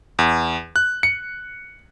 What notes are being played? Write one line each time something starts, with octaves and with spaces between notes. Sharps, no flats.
E2
F#6
C#7